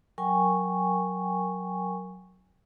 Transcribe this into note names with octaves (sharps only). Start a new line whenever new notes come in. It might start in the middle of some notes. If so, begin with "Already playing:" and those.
F#3 A#4 G5 G#5 C#6